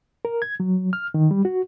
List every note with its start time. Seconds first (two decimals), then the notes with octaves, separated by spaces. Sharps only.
0.25 A#4
0.42 G#6
0.60 F#3
0.93 F6
1.14 D#3
1.31 G3
1.45 F#4